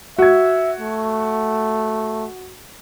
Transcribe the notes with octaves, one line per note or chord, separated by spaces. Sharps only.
F#4 E5 G#6
A3